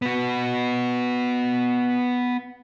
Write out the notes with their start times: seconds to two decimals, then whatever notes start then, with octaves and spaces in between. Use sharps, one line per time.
0.02 B3 F#4